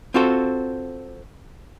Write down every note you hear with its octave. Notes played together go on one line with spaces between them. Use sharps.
C4 F4 F#4 A4 C5